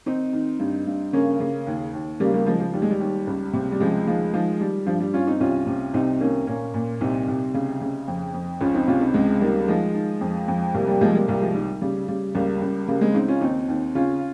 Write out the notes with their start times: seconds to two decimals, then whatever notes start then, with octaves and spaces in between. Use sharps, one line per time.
0.06 D#3 C4 D#4
0.33 D#3
0.60 G2
0.87 G2
1.13 C#3 A#3 C#4
1.40 C#3
1.67 D#2
1.93 D#2
2.20 C#3 G3 A#3
2.34 G3 A#3
2.46 C#3 F3 G#3
2.60 F3
2.74 D#2 G3
2.82 G#3
2.91 G3
3.00 D#2
3.27 C#2
3.53 C3
3.72 G3
3.80 C#2 F3 G#3
4.07 D#3 F3 G#3
4.33 D#3 F3 G#3
4.60 D#3 G3
4.87 G2 F3
5.00 G3
5.14 G2 C#4 F4
5.27 C4 D#4
5.40 C2 C#4 F4
5.67 C3
5.94 C2 C4 D#4
6.20 D#3 A#3 C#4
6.47 A#2 A#3 C#4
6.74 A#2
7.01 C2 C4 D#4
7.28 C2
7.54 C#3
7.81 C#3
8.08 F2
8.34 F2
8.61 C#2 C#4 F4
8.74 C4 D#4
8.88 C3 C#4 F4
9.01 C4 D#4
9.14 C#2 G#3 C4
9.41 D#3 G3 A#3
9.68 D#3 F3 G#3
9.95 D#3
10.21 F2
10.48 F2
10.74 C2 G3 A#3
10.88 G3 A#3
11.01 C3 F3 G#3
11.14 G3 A#3
11.28 C2 G3 A#3
11.41 F3 G#3
11.55 D#3 G3
11.81 C#3 G3
12.08 C#3 G3
12.35 C#2 G3 A#3
12.62 C#2
12.88 C#3 G3 A#3
13.01 G#3 C4
13.15 C#3 C4 D#4
13.28 C#4 F4
13.41 D#2 C4 D#4
13.68 D#2
13.95 C#3 C#4 F4